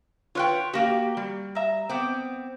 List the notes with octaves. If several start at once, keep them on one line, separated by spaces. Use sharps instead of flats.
F4 B4 C#5 F#5 G5
A#3 F#4 G4
G3
E5 A#5
B3 C4 D6